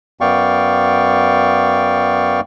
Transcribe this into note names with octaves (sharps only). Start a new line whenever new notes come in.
F#2 B3 D5 F5 G5 C#6